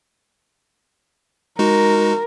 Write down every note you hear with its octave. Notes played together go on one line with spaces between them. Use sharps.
G#3 D#4 F#4 A#4